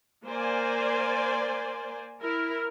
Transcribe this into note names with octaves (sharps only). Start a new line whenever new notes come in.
A#3 C5 D5 G#5
E4 A#4